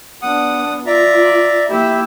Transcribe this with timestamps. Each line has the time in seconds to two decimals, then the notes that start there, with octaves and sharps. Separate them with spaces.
0.22 B3 D4 F#5 D#6
0.86 F4 D5 E5 A#5
1.69 A#3 E4 G4 E5